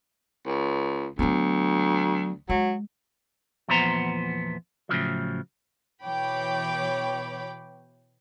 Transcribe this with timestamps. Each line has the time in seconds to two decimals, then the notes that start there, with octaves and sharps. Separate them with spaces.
0.46 C#2
1.19 D2 F#3 B3
2.49 F#3 G#3
3.68 E2 A#2 F3 B3 C5 A#5
4.89 A2 C#3 F3 F#3
6.03 B2 E3 C#5 G5 B5 D6